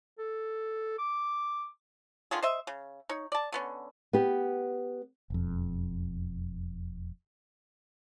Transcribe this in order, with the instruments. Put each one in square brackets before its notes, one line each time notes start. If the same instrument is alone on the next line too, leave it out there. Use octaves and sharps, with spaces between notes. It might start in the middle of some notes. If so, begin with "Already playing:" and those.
[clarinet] A4
D6
[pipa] D3 D#3 F4 G#4
C5 D#5 E5
C#3
D#4 C#5
D5 A5
D3 B3 C#4
[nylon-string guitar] B3 G4
[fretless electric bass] E1 F2